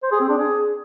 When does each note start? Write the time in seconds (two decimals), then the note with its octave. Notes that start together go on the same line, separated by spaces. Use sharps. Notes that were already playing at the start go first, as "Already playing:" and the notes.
0.03 C5
0.12 G#4
0.20 C4
0.29 D4
0.38 G#4